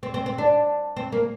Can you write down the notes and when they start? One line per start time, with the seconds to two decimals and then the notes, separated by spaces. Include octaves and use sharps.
0.03 C4
0.14 C4
0.26 C4
0.38 D4
0.97 C4
1.12 A#3